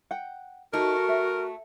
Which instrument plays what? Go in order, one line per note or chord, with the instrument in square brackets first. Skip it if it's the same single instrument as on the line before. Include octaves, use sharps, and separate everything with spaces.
[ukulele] F#5 G5
[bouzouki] A3 [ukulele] D#4 [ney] F#4 [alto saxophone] A#4
[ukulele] E5